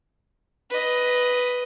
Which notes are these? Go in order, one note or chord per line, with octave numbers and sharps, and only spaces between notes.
B4 D#5